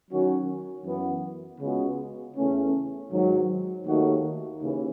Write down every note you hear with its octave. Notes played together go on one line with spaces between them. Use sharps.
D#3 F#3 C#4 F#4
F#2 E3 B3
C#2 C#3 G#3 B3 F#4
E2 C#3 E3 A3 C#4
G#2 D#3 F#3
D#2 D#3 A3 D#4 F#4
D#2 C#3 E3